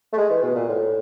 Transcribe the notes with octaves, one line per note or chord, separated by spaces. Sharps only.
A3
G#3
E3
B2
A#2
A2